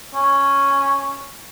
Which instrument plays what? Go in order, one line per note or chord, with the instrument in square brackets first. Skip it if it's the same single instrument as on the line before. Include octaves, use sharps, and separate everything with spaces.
[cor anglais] C#4